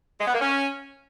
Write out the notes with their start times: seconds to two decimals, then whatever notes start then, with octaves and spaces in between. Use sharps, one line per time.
0.20 G#3
0.27 B3
0.34 A#3
0.40 C#4